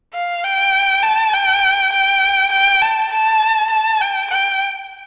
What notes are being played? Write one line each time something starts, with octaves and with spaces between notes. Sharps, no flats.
F5
G5
A5
G5
G5
G5
A5
A5
A5
G5
G5